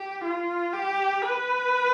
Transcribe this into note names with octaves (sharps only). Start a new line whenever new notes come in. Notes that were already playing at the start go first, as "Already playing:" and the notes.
Already playing: G4
F4
G4
B4